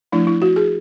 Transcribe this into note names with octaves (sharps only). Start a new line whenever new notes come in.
F3 A3 D4 E4
E4
F#4
G#4